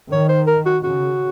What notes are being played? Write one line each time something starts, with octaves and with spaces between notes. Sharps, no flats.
D#3 C#5
C5
A#4
F#4
C#3 F#4